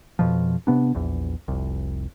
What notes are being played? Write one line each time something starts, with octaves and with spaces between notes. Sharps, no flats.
F2 B2 F3
C3 B3 D4
A#1 E2
F1 C2